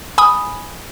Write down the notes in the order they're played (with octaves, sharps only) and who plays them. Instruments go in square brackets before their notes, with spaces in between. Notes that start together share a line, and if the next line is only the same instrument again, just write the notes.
[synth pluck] G#5 B5 D#6